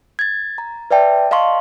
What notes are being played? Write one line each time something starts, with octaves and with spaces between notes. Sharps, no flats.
G#6 A6
A#5
B4 D5 E5 G5 A5
D#5 F5 A5 C6 C#6